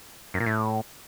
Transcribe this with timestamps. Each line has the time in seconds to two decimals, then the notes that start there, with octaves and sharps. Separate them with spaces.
0.34 F#2
0.40 A#2
0.46 A2